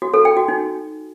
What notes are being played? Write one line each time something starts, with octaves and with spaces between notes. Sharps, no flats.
F#4
A4
G5
F#4
D#4